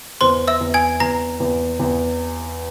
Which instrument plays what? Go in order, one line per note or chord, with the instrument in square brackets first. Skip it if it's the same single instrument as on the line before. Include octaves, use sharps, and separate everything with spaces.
[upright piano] E2 [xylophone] C5 C6
[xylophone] E5 E6
[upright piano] E2
[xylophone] G#5 G#6
[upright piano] E2 [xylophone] A#5 A#6
[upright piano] E2
E2